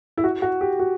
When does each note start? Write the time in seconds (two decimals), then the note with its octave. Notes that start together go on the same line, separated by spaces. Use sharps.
0.17 E4
0.24 F#4
0.42 F#4
0.61 G4
0.79 F#4